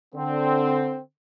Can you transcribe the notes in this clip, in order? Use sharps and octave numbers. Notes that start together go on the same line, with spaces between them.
D3 C4